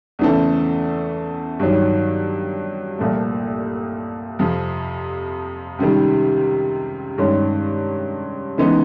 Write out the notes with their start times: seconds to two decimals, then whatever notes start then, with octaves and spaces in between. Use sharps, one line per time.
0.19 E2 C#3 E3 A3 C4
1.59 G2 D#3 F#3
2.98 C2 A#2 F3 A3
4.39 F2 C3 F3
5.79 C#2 C3 D#3 G3
7.18 G2 D#3 G#3 C#4
8.58 C#3 E3 G#3 B3 D#4